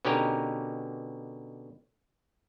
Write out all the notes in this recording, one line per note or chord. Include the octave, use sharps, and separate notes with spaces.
B2 D3 C#4 D#4 G4 A#4